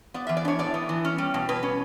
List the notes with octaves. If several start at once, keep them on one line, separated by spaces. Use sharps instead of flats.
B3 D5
E3 E5
D5
D4 C#5
A2 D5
B3
E3
C#4
G3
B2
B2 B4
C#4